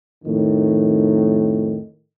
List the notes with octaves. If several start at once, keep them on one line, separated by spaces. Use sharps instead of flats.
F2 A2 D#3